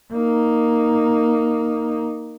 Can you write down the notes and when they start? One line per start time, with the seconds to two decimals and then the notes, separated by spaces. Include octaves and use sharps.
0.13 A#3 D#4